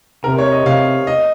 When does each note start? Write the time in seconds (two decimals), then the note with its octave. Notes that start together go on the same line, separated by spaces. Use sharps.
0.24 C3 A#4
0.38 C#5
0.51 D#5
0.65 C3 F5
1.07 D#5